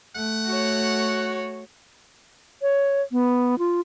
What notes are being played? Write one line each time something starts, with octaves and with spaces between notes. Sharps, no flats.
A3 F#5
F#4 C#5
C#5
B3
F4